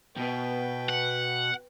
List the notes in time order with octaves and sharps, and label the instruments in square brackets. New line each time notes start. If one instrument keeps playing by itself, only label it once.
[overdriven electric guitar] B2 [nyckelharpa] B4 G5
[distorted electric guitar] F#5